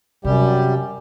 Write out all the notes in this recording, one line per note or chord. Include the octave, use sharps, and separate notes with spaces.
F#2 C3 G3 G4